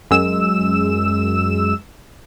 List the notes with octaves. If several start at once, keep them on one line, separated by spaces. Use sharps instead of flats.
F#2 G#3 E6 E7